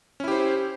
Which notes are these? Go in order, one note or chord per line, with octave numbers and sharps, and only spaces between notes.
C#4 E4 G4 C5